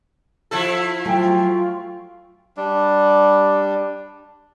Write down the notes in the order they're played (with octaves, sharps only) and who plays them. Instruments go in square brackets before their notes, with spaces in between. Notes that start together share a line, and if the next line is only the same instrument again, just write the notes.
[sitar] F3 E4 A4
[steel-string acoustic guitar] F#3 A3 G#5 [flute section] F4 C#6 [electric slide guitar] F#4 G5
[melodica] G3 D4